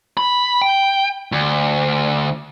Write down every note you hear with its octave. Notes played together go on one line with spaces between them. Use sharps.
B5
G5
D2